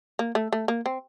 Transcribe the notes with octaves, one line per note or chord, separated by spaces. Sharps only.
A#3
A3
A3
A#3
C4